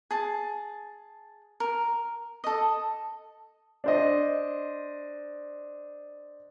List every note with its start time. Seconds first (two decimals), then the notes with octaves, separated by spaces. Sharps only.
0.11 G#4 A5
1.60 A#4
2.44 A4 D#5
3.84 D4 C5 D#5